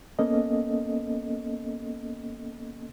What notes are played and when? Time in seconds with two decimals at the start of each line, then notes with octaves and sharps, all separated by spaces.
0.19 A#3 B3 C#4 A4 D#5